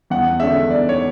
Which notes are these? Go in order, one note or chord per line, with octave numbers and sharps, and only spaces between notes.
E2 F#5
D3 G#3 C#4 E5
E2 D5
C#5